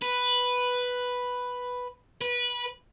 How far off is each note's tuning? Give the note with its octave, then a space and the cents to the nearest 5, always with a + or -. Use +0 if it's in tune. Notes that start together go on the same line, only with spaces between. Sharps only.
B4 +0
B4 -20